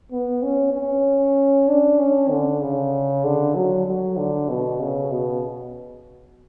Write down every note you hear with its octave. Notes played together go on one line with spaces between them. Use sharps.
B3
C#4
C#4
D4
C#4
D3
C#3
D3
F#3
F#3
D3
B2
C#3
B2